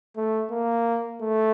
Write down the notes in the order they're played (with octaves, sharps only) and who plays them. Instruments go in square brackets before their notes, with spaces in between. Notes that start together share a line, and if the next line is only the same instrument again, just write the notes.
[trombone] A3
A#3
A3